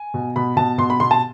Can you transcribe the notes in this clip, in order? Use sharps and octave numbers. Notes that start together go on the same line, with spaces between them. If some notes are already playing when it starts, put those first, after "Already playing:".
Already playing: G#5
B2
B2 B5
B2 A5
B2 C6
B5
B2 C6
A5